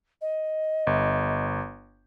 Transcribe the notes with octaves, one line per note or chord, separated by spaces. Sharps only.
D#5
G1